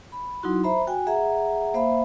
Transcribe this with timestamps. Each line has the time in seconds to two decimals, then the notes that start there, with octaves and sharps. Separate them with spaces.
0.12 B5
0.43 F#3 D#4 E4 F#4 C6
0.64 C5 E5 A#5 B5
0.87 F#4 G5 G#5
1.07 G#4 E5 F#5 A#5
1.74 A#3 C5 E5 F5 B5